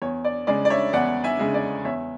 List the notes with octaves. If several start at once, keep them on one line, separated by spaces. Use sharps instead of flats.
E2 C#5
D5
C#3 G#3 D5
D5
C#5 E5
E2 D5 F#5
E5 G#5
C#3 G#3
D5
E2 C#5 E5